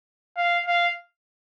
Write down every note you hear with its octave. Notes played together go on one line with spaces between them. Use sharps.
F5
F5